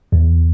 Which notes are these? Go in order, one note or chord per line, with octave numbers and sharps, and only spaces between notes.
E2